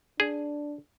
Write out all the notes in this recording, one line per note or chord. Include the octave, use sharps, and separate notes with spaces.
D4 G#4